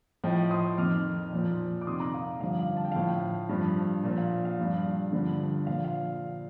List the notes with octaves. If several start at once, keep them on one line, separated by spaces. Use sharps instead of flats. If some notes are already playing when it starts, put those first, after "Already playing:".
A2 F3 D#5 G5
C6 D#6
F2 D#3 D6 F6
A#2 F3
D6
F2 C3 D#3 C6 D#6
A#5 D6
F5
G2 D3 F3 F5
F5
A5
G5
A2 F3 F5 A5
G2 F3
A#2 F3
F5
F5
G2 F3
G2 D3 F3
A#2 F3 F5
F5